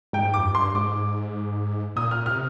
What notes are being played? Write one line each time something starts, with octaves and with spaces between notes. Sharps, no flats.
G#2 G5
F2 D6
G2
C6
G#2 D6
A#2 D#6
F6
C3 F6